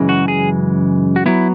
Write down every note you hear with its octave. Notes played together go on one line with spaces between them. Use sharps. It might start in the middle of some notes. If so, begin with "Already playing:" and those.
Already playing: F#2 C#3 E3 G#3
F#4
G#4
F#4
F#3 B3 E4